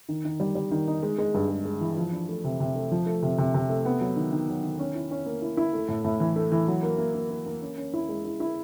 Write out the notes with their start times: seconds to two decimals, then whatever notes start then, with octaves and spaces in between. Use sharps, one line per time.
0.09 D#3
0.25 D#3
0.40 G3
0.55 G3
0.71 D#3
0.88 D#4
1.03 G#3
1.18 G#3
1.34 G2
1.50 G#3
1.65 G#3
1.81 E3
1.97 F3
2.12 D4
2.29 A3
2.44 C3
2.60 C3
2.75 A3
2.92 F3
3.06 A3
3.22 C3
3.38 C3
3.54 C3
3.69 A3
3.85 B3
4.01 F#3
4.16 D#3
4.32 D#3
4.48 F#3
4.63 D#3
4.79 C#4
4.95 E4
5.11 C#4
5.26 A#3
5.42 E4
5.57 E4
5.73 A3
5.89 A2
6.05 A2
6.20 E3
6.36 A3
6.52 E3
6.68 F#3
6.83 A#3
6.98 A#3
7.15 A#3
7.30 A#3
7.46 A#3
7.62 C#4
7.77 C#4
7.94 E4
8.09 G#3
8.24 E4
8.40 E4